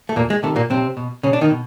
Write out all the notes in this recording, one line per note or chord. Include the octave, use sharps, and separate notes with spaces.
A3
E2 A#2 A#3
G#3
C3 D#3 A3
A#2 A#3
B1 C3 C4
B2
B1 C#3 C#4
D4
D#3 D#4
B2